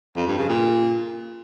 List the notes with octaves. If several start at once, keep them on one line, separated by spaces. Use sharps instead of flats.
F2
G2
C#3
A#2